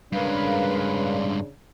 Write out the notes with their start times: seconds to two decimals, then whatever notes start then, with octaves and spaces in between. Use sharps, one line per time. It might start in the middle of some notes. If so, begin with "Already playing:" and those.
0.13 G2 C#3 G#3 D4 A#4 B4 F5